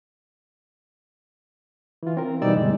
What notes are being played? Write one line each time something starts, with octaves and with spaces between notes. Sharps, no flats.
E3 F4
C4 A#4
B2 E3 G3 D#4 D5 E6
D2 G2 G#3